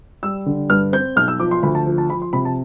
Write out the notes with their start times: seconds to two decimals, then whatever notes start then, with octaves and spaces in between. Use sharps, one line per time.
0.23 G3 E6
0.46 D3
0.70 G2 F6
0.93 C4 G6
1.16 B1 F6
1.28 E6
1.40 F3 D6
1.51 C6
1.63 D2 B5
1.75 A5
1.86 F3
1.98 A5
2.10 F3 B5
2.22 C6
2.33 C3 B5
2.45 A5